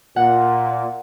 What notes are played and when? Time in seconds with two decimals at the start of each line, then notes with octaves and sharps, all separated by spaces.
0.16 A#2 F#5